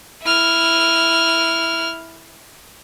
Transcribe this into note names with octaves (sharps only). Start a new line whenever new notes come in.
E4 F6